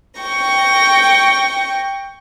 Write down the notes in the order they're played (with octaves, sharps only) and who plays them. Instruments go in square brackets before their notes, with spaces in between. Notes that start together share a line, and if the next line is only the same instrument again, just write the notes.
[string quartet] G5 C#6 A#6